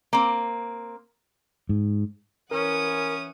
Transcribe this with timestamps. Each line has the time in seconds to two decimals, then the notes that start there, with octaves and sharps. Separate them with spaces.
0.13 A#3 C4
1.69 G#2
2.51 E3 C#4 A#4 F#5 D#6